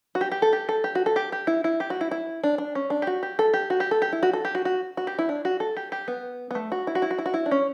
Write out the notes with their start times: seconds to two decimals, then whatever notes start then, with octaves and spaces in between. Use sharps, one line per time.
0.15 F#4
0.21 G4
0.32 G4
0.42 A4
0.53 G4
0.69 A4
0.84 G4
0.95 F#4
1.06 A4
1.16 G4
1.32 G4
1.47 E4
1.64 E4
1.80 G4
1.90 F#4
2.01 E4
2.11 E4
2.43 D4
2.58 D4
2.75 C#4
2.90 D4
3.02 G4
3.07 F#4
3.23 G4
3.39 A4
3.54 G4
3.70 F#4
3.80 G4
3.91 A4
4.02 G4
4.12 E4
4.23 F#4
4.33 A4
4.45 G4
4.55 F#4
4.65 F#4
4.97 F#4
5.07 G4
5.19 E4
5.29 D4
5.45 F#4
5.60 A4
5.77 G4
5.92 G4
6.08 B3
6.51 B3
6.55 A3
6.72 F#4
6.87 E4
6.95 F#4
7.02 E4
7.11 F#4
7.18 E4
7.26 F#4
7.34 E4
7.46 D4
7.51 C#4